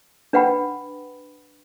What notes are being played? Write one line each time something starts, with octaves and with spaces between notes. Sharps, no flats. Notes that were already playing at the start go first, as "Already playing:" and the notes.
D4 B4 F#5 G5 B5